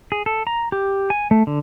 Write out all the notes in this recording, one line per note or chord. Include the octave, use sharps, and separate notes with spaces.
G#4
A4
A#5
G4
G#5
A3
D3